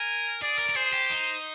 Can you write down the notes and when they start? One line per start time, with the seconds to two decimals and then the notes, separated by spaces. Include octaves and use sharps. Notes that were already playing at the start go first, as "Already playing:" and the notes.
Already playing: A#4 G#5
0.42 G#4 D5
0.59 A#4
0.69 A#4
0.76 G#4 C5
0.93 G4
1.10 D#4